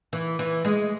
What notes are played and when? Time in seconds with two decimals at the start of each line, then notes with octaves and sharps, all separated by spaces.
0.13 E3
0.39 E3
0.65 G#3